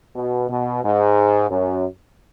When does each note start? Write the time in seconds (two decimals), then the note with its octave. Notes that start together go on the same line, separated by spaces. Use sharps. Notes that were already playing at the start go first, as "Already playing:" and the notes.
0.15 B2
0.49 B2
0.83 G#2
1.50 F#2